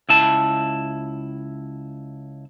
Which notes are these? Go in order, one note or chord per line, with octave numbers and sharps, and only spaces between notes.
C#2 E4 A5